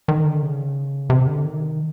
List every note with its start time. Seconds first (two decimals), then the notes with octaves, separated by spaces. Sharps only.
0.08 D#3
0.25 D3
0.42 C#3
1.10 C3
1.27 D3
1.44 D#3